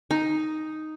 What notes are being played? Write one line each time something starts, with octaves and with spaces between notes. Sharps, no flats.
D#4